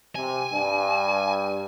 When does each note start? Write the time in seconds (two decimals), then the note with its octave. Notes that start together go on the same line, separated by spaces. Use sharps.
0.15 C3 G#5
0.52 G2